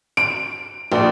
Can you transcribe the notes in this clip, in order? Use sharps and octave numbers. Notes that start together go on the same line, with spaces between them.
D7
A#1